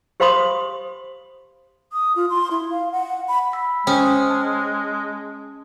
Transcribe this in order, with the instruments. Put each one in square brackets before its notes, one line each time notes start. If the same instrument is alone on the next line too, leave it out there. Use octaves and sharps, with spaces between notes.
[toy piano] G4 C5 F5 B5 C6 D#6
[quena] D#6
F4
C6
E4
F5
F#5
B5
[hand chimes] B5 E6 B6
[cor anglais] G#3 [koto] C#4 [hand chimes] C5 G5 D#6
[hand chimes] A5